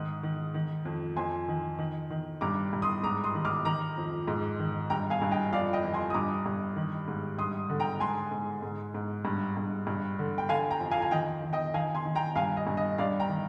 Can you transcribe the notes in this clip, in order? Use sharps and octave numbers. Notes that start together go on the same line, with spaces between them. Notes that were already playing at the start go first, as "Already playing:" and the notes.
Already playing: G#2 D#3 D#6
D#3
D#3
F2
F2 G#5 C6
D#3
D#3
D#3
G2 A#5 D6
G2
C6 D#6
G#2 A#5 D6
C6 D#6
D#3
D6 F6
D#3 A#5 D6
F2
G#2
D#3
G2 G5 A#5
F5 G#5
G2
D#5 G5
F2 D5 F5
D#5 G5
F2
G#5 C6
D#6
G2 A#5 D6
G2
D#3
G#2
G2 C6 D#6
D3
G5 A#5
G#2 G#5 C6
G#2
G#2
G#2
G2
G2
G2
D3
G5
D3 F5 G#5
G5 A#5
F2
F5 G#5
G#5
D#3 D#5 G5
D#3
D#5 G5
D#3 F5 G#5
G#5 C6
D#3
G5 A#5
G2 F5 G#5
D#5
G2
D#5
G2 D5 F5
G5 A#5
D#3